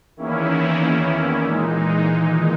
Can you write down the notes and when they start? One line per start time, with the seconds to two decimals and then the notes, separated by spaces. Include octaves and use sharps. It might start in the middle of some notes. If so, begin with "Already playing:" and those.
0.16 E2 D#3 E3 A#3 C#4 E4
0.81 E3
1.45 A#2 E3 G#3 D#4
2.09 D#3